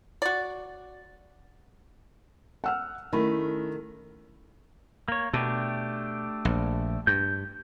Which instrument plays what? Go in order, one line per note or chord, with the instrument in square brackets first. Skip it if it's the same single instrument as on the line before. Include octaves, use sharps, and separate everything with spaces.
[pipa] F#4 D5
[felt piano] F#5 E6 F6
[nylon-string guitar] D#3 A3 [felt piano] C#4 E4 B5
[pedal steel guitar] A#3 C#5
[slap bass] B2 [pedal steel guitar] A3 D4 G4
[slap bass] A#1
[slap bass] G2 [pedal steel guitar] G6